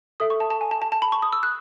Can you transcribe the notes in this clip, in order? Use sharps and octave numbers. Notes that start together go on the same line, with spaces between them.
A4 E5 D#6
C#6
A5
A5
G#5
A5
A5
A5
B5
C#6
D#6
E6
F#6